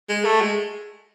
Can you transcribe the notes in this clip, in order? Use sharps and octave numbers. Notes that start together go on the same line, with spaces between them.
G#3
A3
G#3